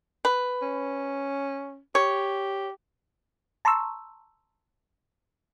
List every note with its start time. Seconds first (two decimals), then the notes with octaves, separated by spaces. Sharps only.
0.25 B4
0.62 C#4
1.95 G4 C#5
3.65 A5 A#5 C6 C#6 E6